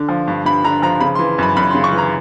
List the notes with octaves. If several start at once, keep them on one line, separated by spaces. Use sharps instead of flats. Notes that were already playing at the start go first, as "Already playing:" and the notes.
Already playing: D3
F3
G2
G2 B5
D3 A#5
F3 A#5
C#3 B5
C6
E3
F#2 B5
F#2 B5
C6
C#3
C#6
E3
A#5